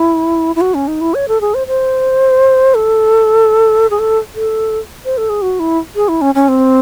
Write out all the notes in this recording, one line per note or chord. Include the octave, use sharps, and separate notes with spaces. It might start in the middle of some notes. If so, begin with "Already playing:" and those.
Already playing: E4
E4
F#4
C#4
D#4
E4
C#5
A4
G#4
C5
C5
A4
G#4
A4
A4
C5
A4
G#4
F#4
E4
G#4
E4
C#4
C#4
C4